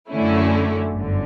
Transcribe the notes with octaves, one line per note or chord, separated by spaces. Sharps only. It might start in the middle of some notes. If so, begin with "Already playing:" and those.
F#2 D3 A3 C#4 E4
G1 F#2 D3